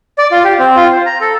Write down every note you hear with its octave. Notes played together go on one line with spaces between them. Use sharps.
D5
F4
G4
C4
F4
C5
A#5
A4